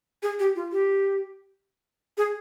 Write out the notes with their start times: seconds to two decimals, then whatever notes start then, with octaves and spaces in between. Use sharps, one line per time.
0.23 G#4
0.39 G4
0.56 F4
0.72 G4
2.17 G#4